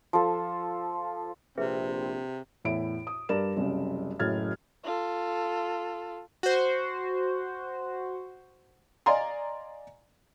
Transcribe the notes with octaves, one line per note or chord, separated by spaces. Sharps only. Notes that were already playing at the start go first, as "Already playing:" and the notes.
F3 A4
A#1 C3 C4 G#4 B4 E5
E2 A2 E4 D7
D#6
G2 A#4 D5 E7
F#1 C2 C#4
F#1 A2 F#3 F6 G#6 A6
F4 A4
F#4 C5
D5 D#5 F5 G#5 A#5 C6